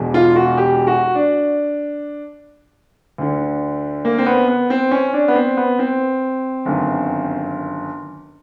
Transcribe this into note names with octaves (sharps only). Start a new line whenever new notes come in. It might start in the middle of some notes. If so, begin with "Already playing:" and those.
Already playing: E1 E2 B2
F4
F#4
G4
F#4
D4
D2 D3
A#3
C4
B3
B3
C4
C#4
D4
B3
C4
B3
C4
G1 F#2 D#3